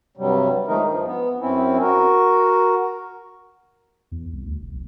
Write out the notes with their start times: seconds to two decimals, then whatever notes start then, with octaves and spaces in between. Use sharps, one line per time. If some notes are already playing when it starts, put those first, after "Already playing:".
0.17 G2 C3 F#3 G3
0.67 D#3 F3 G#3 A3 D#4 A#4
0.85 G2 F3
1.06 B3
1.40 F#2 C4 C#4 E4
1.81 F#4 A#4
4.12 E2
4.32 C2
4.45 D2
4.60 E1
4.73 B1